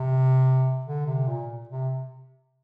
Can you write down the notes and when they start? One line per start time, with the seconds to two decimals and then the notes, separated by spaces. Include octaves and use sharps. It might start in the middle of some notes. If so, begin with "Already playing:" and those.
Already playing: C3
0.85 D3
1.06 C3
1.27 A#2
1.69 C3